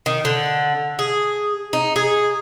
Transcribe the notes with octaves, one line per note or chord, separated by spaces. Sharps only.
D#3
D3
G#4
D#4
G#4